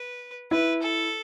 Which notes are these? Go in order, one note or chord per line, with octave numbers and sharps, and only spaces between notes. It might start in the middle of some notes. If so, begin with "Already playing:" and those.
Already playing: B4
E4 B4
A4